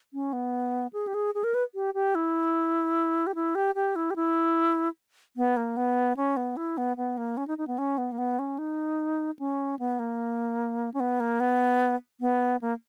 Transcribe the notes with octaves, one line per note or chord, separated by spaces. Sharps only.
C#4
B3
G#4
G4
G#4
G#4
A#4
B4
G4
G4
E4
G4
E4
G4
G4
E4
G4
E4
B3
A#3
B3
C#4
B3
E4
B3
B3
A#3
C#4
D#4
D#4
B3
C#4
B3
A#3
B3
C#4
D#4
C#4
B3
A#3
C#4
B3
A#3
B3
B3
A#3